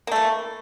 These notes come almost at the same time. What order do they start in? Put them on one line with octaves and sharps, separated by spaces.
A#3 A3 E3